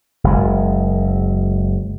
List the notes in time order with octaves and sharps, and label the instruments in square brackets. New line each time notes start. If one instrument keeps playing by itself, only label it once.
[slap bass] F#1 G#3